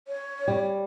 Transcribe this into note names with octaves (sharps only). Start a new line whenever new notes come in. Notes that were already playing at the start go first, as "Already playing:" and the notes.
C#5
G3